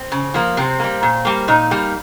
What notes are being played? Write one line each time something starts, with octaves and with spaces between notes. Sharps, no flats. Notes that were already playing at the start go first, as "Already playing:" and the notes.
Already playing: C4
C#3
F3 A#3
C3 C4
G3 A#3
A#2
G3 A#3
A#2 D#4
G3 A#3